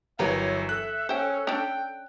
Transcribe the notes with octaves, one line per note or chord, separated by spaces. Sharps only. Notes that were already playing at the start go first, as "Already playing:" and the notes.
G1 E3 F#3 G4 A#4 B4 C#5 E5
A4 F#6
C#4 C5 G5
C#4 D4 G5